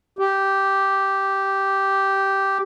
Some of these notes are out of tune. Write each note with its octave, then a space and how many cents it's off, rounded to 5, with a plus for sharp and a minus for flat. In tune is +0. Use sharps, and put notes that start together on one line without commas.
G4 -5